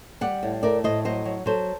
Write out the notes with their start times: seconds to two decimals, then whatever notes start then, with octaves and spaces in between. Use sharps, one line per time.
0.21 G3 D5 F#5
0.43 A2
0.63 A3 A#4 D5
0.84 A2 C5 D#5
1.05 F#3 C5 D#5
1.25 F#3
1.46 F#3 A4 C5